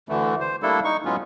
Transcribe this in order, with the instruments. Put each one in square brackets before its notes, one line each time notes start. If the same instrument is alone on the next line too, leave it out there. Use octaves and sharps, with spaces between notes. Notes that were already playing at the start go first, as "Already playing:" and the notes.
[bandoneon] D2 D3 E3 A3
C5
G3 A3 A#3 D4 E4 A4
D#4 C#6
A2 F#3 G#3 B3 C#4 F4